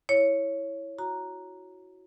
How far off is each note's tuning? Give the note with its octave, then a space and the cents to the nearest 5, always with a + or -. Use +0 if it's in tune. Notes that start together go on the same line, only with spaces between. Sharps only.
E4 +0 C#5 +0
F#4 +0 A#5 +0